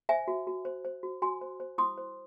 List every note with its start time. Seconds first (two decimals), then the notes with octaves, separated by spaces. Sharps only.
0.09 C5 E5 G#5
0.28 F#4
0.47 F#4
0.65 C5
0.85 C5
1.03 F#4
1.22 F#4 G#5 C6
1.41 C5
1.60 C5
1.78 E4 C6 D#6
1.98 C5